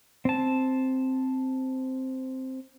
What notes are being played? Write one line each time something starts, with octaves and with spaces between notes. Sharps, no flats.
C4 A5